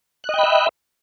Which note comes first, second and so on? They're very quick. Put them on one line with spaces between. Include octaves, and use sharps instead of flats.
F#6 D#5 G5 B5 E5